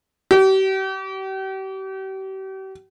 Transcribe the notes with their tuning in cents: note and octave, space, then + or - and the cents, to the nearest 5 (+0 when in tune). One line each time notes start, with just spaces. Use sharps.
G4 -40